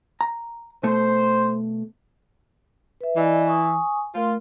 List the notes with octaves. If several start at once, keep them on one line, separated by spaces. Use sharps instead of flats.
A#5
B2 A3 C5
B4 E5
E3 D5 D#5 G#5
G#5 C#6 D#6
A3 F4 A#4